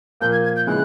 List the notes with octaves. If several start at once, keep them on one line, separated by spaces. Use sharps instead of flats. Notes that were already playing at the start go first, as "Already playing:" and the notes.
A#2 F3 A#3 G6
G#6
G#6
G6
C#3 E3 G#3 F#6